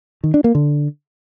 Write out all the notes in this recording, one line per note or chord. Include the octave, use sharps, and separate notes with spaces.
D#3
D4
A#3
D3